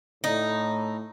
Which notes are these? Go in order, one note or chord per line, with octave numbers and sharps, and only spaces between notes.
A2 D#4